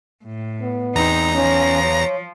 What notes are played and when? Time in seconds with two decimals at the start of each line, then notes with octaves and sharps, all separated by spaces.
0.24 A2
0.62 B3
0.95 E2 C4 D#4 A#5 A#6
1.35 F3 C#4
1.83 C#5